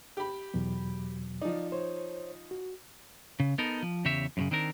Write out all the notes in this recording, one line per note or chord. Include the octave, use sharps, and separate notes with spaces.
G4 B5
E2 B2 F#3
F3 D#4 D5
C5 C#5
F#4
C#3
B3 D#4 A4 A#4
F3
E2 C#3 G4 C#5 E5
F#2 A#2 C#3
D#3 C4 D4 A#4